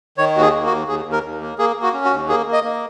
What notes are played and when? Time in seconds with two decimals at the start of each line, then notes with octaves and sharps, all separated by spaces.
0.18 D#3 C#5
0.35 D#2 F#4
0.42 G#4
0.54 A#3
0.66 F#4
0.72 D#2
0.88 D#2 G#4
1.05 D#2
1.12 A#4
1.24 D#2
1.41 A#3
1.58 A#3 G#4
1.76 A#3
1.82 F#4
1.93 C#4
2.05 F#4
2.11 D#2
2.29 A#3 G#4
2.46 A#3
2.53 D#5
2.64 A#3